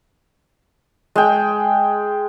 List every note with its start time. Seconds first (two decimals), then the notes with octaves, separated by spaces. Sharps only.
1.15 G#3 G5